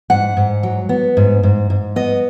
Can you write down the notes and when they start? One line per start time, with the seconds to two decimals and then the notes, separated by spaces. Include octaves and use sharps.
0.10 G#2 F#5
0.37 G#2
0.63 F#3
0.89 B3
1.17 G#2
1.43 G#2
1.70 G#2
1.96 B3 D#5